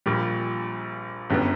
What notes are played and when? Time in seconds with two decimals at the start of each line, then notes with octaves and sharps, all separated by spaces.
0.06 A#1 A#2 G3
1.30 G1 F#2 D3 G3 B3